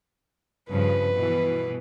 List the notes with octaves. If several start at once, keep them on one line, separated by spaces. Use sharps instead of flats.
G2 C#3 F3 B4
B2 E3